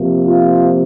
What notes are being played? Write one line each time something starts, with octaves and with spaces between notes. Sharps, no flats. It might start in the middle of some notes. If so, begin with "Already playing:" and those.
Already playing: C3 F3 A#3
F4